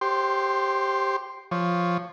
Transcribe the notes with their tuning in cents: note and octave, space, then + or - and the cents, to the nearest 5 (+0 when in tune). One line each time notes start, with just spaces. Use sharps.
G4 +0 C5 +25 C6 +0
F3 +0 C#5 +0